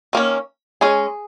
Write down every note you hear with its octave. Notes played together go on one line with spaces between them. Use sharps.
D#3 A#3 C#4
G#3 C#4 G#4